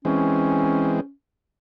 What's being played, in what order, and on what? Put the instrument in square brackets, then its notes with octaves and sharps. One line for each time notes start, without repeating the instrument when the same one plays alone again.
[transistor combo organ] E3 G#3 C4 [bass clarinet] C#4